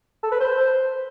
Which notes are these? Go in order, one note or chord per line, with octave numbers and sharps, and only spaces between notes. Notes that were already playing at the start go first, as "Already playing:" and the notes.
A4
B4
C5